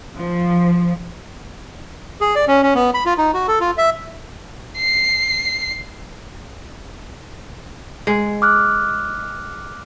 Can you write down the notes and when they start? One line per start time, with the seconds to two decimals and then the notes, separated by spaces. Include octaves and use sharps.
0.20 F3
2.21 G#4
2.36 D5
2.47 C#4
2.63 C#4
2.75 B3
2.94 B5
3.05 F4
3.18 D#4
3.34 F#4
3.48 A4
3.61 F4
3.78 E5
4.77 C7
8.07 G#3
8.42 D6 F6 F#6